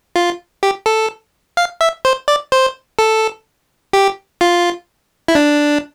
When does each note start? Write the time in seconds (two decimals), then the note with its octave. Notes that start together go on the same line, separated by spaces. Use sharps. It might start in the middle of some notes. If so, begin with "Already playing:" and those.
0.16 F4
0.63 G4
0.86 A4
1.57 F5
1.81 E5
2.05 C5
2.28 D5
2.52 C5
2.99 A4
3.93 G4
4.41 F4
5.28 E4
5.35 D4